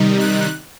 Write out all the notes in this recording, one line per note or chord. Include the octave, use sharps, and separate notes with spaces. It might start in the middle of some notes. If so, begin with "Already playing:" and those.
Already playing: C3 D#3 G3 D#4
F#6